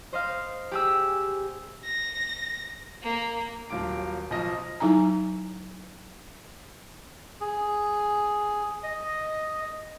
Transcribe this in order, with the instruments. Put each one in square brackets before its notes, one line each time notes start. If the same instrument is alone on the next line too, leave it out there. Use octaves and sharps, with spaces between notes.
[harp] C5 D#5 F5
G4 G#4 E6
[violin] A#6
A#3
[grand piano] D#1 F#3 F4 D6 D7
B1 F3 D#5 A#6
[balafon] F#3 D#4 E4 G#5 A#5
[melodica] G#4
D#5